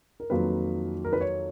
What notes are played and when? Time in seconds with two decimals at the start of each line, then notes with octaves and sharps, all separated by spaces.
0.20 A#4
0.30 F2 D#3 F#3 A#3 F4 B4
1.05 A#4
1.13 B4
1.21 C#5